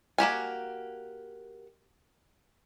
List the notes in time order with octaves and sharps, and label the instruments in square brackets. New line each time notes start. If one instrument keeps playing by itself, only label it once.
[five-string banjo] A#3 F#4 G4 G#5